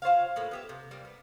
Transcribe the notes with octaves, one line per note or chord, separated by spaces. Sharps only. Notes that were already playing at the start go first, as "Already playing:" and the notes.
F4 C5 C#5 F5
A2 A#3 B4
B3 G4 E5
C3
G3 A#3
B3